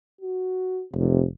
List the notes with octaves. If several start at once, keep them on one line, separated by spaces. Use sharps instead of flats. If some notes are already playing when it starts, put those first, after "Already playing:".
F#4
F1 C3